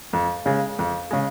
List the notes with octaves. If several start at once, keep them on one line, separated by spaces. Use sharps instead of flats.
F2
C#3 G#3
F2
C#3 G#3